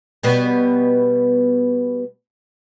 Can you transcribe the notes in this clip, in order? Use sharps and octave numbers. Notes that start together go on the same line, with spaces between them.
B2 G3 B3